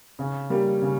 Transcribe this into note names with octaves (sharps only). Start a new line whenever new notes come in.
C#3
G3 A#3
C#3